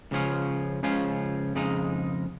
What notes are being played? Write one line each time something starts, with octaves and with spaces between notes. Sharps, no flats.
C#2 C#3 F3 C#4 F4
C#2 C#3 F3 C#4 F4
F2 C#3 G#3 D#4